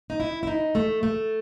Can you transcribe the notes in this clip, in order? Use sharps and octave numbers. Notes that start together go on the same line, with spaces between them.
D#4
E4
E4
D#4
A3
A3